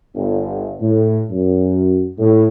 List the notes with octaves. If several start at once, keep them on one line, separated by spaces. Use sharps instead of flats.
G1
A2
F#2
A2